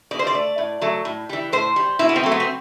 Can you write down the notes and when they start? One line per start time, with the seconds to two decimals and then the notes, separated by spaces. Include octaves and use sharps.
0.11 B2 D5
0.19 C5
0.27 D5
0.34 A3
0.58 A2
0.82 F#3 A3
1.05 A2
1.29 E3 G3
1.52 A2 C5
1.76 G3
1.99 B2 E4
2.09 B3
2.16 C4
2.24 F#3 A3
2.32 B3
2.40 C4